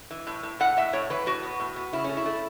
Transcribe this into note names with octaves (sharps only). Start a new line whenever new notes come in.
E3
A2
A2
A2 F#5
A2 E5
A2 C#5
E3 B4
A2 F#4
B3
A2
B3
C#3 E4
A3 C#4
E4
A3